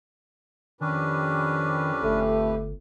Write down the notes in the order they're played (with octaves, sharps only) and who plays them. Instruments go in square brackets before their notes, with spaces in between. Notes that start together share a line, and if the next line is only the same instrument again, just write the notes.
[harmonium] F2 G4 B4 [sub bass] D#3 [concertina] C#4 D4
[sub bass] G1 [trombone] A3